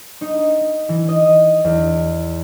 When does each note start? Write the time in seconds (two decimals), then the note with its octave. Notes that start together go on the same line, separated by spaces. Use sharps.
0.21 D#4
0.89 E3
1.09 D#5
1.65 E2